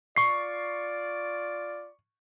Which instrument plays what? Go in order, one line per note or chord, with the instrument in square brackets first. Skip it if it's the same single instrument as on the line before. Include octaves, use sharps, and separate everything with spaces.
[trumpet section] F4 D5 [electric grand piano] C#6 C7